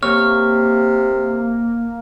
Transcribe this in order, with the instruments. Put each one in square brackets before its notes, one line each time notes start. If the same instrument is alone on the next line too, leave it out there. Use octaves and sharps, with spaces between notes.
[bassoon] C3 [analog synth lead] A#3 [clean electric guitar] C#5 [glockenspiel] F6